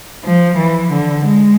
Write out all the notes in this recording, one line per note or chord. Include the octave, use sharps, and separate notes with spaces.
F3
E3
D3
G#3